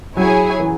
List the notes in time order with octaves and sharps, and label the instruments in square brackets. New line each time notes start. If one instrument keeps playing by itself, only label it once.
[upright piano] F#3 [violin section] E4 G#4 C#5 G#5
[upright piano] E3